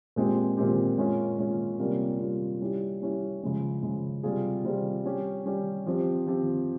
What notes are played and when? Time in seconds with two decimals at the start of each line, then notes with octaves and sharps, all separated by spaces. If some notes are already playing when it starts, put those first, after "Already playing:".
0.16 A#2 G#3 C4 G4
0.57 A#2 G#3 C4 G4
0.98 A#2 G#3 C#4 F4
1.39 A#2 G#3 C#4 F4
1.79 C3 G3 A#3 C#4 F4
2.19 C3 G3 A#3 C#4 F4
2.60 G3 C#4 E4 G4
3.02 G3 C#4 E4 G4
3.42 C#3 F3 G#3 C#4
3.82 C#3 F3 G#3 C#4
4.23 C3 G3 C4 F4 G#4
4.64 C3 G3 C4 F4 G#4
5.05 G3 C#4 G4
5.45 G3 C#4 G4
5.86 F3 C4 G4
6.27 F3 C4 G4